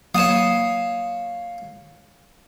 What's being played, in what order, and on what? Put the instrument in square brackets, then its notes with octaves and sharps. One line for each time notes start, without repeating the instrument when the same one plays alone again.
[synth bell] F#3 A#3 D#7 [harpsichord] C#5 F5 [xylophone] D#6 E7